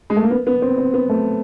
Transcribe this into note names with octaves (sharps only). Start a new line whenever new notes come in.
G#3
A3
A#3
B3
B3
C4
C4
B3
A3